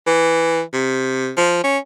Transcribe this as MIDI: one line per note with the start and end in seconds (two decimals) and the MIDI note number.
0.06 0.61 52
0.73 1.31 48
1.37 1.63 53
1.64 1.78 61